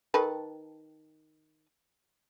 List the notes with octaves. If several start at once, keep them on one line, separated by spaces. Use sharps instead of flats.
D#3 A4 B4